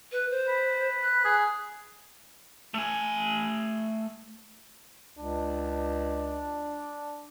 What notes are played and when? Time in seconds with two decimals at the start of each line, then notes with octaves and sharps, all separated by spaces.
0.11 B4
0.30 C5
0.48 B4
1.02 F#6
1.25 G#4
2.74 A3 G#5
5.18 C#2 D4